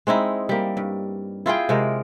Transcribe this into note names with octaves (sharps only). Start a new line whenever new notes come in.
G#3 C4 D#4 E4
G3 A#3
G2
E4 F4 G#4 G5
C3 G#3 A#4